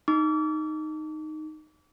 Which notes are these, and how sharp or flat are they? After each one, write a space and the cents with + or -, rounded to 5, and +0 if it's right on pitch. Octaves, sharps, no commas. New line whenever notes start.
D#4 -5 D6 -40